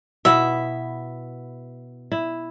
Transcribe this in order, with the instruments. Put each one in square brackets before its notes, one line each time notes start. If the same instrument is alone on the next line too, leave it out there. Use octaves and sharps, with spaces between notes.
[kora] B2 B3 E4 [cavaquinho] E5
[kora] E4